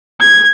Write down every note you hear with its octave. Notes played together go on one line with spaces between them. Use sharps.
G#6